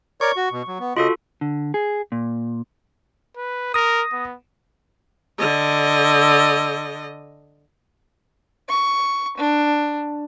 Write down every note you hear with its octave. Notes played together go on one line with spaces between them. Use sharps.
A#4 C#5 D5 C#6
F#4
B2
F#3
B3
C#3 F4 F#4 A4 D#5
D3
G#4
A#2
B4
A#4 D#6 A#6
B3
D3 D#5
C#6
D4